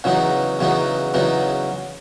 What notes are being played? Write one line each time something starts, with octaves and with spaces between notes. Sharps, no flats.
E2 C#3 F#3 B3 D#4
E2 C#3 F#3 B3 D#4
E2 C#3 F#3 B3 D#4